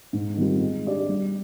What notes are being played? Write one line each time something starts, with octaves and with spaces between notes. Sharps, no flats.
G#2
D#3 G3 C4 F4
G#3
D4 G4 D5
G3